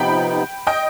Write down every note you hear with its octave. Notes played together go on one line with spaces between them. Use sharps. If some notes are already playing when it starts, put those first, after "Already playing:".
Already playing: C3 F3 B3 D#4 G5 B5
D#5 G5